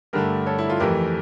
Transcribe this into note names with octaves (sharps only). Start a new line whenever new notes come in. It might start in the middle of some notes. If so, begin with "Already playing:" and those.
G2 D3 A3 G4 A#4
A4 C#5
E4
F4 A4
F2 E3 A3 G4 A#4